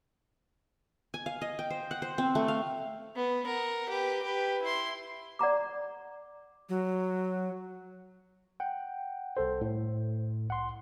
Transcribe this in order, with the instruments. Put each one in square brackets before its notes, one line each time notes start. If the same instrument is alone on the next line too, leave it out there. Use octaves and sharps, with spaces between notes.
[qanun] G#5
F5
D#5
G5
C5
F#5
C5
C4
A3
F5
[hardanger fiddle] B3
A#4 F#5
G4 B4
G4 B4
E4 C6
[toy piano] D5 F#5 A#5 D6
[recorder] F#3
[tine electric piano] F#5 G5
C2 A4 C5
A2
C2 F#5 C6